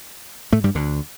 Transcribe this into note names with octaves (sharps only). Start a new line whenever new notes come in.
A2 A3
G2 G3
D2 D3